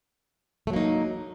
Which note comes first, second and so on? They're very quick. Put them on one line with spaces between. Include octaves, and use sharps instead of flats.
A3 F#3 A#3 D#4